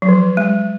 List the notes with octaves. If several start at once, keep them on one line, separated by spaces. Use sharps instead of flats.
F#3
F3
G#3